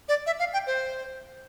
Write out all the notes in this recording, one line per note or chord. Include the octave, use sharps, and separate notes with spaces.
D5
E5
F5
G5
C5